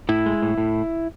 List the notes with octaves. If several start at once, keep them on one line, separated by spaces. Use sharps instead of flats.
A2 E4
G#3
A2
A2